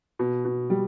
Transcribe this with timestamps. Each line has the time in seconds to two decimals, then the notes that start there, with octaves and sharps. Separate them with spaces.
0.19 B2
0.45 B2
0.70 G3